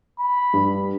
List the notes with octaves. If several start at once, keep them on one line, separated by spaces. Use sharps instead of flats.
B5
G2